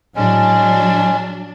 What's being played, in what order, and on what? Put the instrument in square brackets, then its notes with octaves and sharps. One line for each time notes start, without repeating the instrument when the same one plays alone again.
[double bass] A2 [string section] F#3 D4 [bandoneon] G#3 C#4